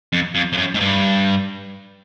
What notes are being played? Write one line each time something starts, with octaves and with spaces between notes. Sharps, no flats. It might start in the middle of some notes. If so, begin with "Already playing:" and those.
F2
F2
F2
F#2
G#2
G2